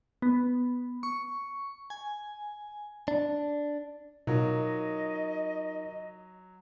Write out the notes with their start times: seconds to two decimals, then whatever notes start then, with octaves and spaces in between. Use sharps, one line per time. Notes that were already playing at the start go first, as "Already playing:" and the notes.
0.22 B3
1.03 C#6
1.90 G#5
3.08 D4
4.27 B2 F#3 D#4 F4 A#4 D#5